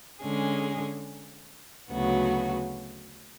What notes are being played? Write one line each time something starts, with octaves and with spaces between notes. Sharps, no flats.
D3 G#3 C#4 G#4
D2 C#3 F#3 B3 F#4